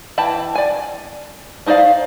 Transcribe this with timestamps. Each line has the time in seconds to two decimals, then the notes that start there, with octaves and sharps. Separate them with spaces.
0.18 E3 G5 A5 B5
0.55 D5 G#5
1.66 D4 D#4 C5 D5 F5